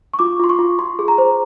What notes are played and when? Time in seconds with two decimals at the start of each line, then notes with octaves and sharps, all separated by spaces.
0.14 C#6
0.19 F4 D6
0.39 F4 C6
0.49 C#6
0.59 F4
0.79 F4 C6
0.99 G#4
1.08 A#5
1.18 C5